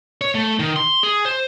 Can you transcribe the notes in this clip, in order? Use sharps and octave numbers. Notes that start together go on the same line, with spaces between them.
C#5
A3
D#3
C6
G#4
C5